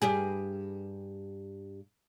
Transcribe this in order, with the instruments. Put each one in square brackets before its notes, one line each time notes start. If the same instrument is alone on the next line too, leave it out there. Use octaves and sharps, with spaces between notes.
[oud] G2 G4 G#4